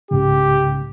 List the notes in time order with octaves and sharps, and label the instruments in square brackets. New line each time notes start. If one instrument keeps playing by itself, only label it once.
[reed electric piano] C2 G#2 C#3 [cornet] G4